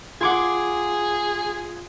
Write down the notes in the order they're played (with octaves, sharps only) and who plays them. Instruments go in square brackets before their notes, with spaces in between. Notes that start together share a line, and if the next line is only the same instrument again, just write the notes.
[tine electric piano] F4 C6 [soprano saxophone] G#4 [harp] F#5 D6 G#6